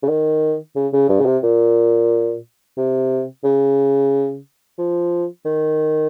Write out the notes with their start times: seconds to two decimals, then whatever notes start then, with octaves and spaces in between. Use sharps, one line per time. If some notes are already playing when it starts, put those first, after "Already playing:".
0.03 C#3
0.08 D#3
0.76 C#3
0.93 C#3
1.09 G2
1.20 C#3
1.26 C3
1.43 A#2
2.77 C3
3.44 C#3
4.78 F3
5.45 D#3